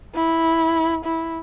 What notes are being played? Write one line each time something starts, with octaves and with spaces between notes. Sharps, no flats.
E4
E4